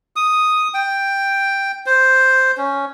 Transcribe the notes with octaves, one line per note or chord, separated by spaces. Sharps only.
D#6
G5
C5
C#4